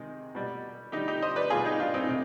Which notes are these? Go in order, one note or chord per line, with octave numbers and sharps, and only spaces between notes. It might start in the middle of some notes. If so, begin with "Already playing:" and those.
Already playing: C3 D#3 G#3
B2 G3
D3 G3 D#4 G4
D#4 G4
C5 D#5
B4 D5
B2 G3 F4 G#4
D#4 G4
D4 F4
C4 D#4
C3